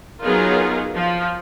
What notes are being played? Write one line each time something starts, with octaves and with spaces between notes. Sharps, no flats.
F#3 B3 D#4 F4 G#4 A#4
F3